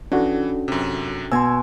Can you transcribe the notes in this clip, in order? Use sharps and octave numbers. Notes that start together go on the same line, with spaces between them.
E3 C#4 D4 F#4 A4
F#2 C3
B2 G#5 C6 E6 G#6